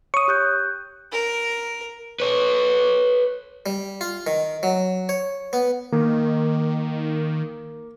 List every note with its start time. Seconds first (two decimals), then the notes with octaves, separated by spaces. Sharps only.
0.14 C#5 C#6 D#6
0.28 G4 F#6 G6
1.12 A#4
2.20 B4 C#5
3.66 G3
4.01 F4
4.27 D#3
4.63 F#3
5.09 C#5
5.53 B3
5.92 D#3 A#3